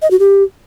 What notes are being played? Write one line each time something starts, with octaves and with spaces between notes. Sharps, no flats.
D#5
F#4
G4